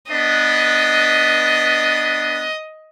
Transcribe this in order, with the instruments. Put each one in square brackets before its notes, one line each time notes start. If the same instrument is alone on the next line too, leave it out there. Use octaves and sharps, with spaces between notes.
[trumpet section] B3 D4 B4 [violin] D#5